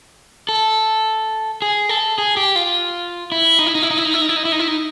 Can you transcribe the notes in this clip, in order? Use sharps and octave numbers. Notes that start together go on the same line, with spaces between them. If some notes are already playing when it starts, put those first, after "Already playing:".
A4
G#4
A4
G#4
G4
F4
E4
D#4
E4
D#4
E4
D#4
E4
D#4
E4
D#4
E4
D#4
E4
D#4
E4
D#4